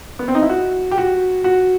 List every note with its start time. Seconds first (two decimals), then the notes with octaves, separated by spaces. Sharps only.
0.19 B3
0.28 C4
0.35 D#4
0.42 E4
0.49 F#4
0.91 G4
0.98 F#4
1.44 F#4